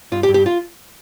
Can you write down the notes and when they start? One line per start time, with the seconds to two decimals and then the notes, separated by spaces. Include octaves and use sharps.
0.12 G2 F4
0.23 G4
0.29 G2
0.34 G4
0.46 F4